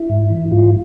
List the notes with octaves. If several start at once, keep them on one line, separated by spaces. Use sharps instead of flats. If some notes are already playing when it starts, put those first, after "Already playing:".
Already playing: E4
G#2
E3
G#2 F4